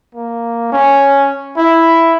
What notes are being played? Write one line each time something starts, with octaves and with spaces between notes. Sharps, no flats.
A#3
C#4
E4